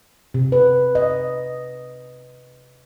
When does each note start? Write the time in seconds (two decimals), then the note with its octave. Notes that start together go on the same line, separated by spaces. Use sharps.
0.34 C3
0.52 B4
0.95 D#5